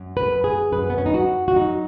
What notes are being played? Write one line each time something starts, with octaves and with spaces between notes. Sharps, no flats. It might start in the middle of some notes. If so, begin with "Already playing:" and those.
Already playing: F#2
B4
F#2
G#4
F#2 B4
B3
C#4
D#4
F#2 F#4
F#4
F#3 D#4